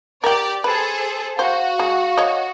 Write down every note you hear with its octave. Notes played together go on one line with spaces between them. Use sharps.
G4 A#4 D5 G5
G#4 A4 B4 C5
F#4 C5 F5
G#3
C#5 D#5